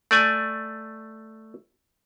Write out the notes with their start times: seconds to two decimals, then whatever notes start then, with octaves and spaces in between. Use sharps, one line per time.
0.11 A3 D5 G#5